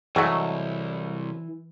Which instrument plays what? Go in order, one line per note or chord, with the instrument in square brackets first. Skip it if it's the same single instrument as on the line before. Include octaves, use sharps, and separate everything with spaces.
[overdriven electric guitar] C2 [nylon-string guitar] E3 [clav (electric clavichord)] F#3 A3 [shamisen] G#3 F#4